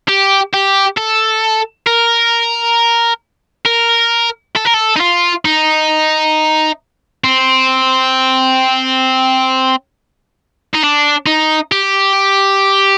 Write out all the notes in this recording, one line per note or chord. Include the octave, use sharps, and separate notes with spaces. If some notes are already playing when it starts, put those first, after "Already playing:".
G4
G4
A4
A#4
A#4
A4
A#4
A4
D#4
F4
D#4
C4
D#4
D4
D#4
G4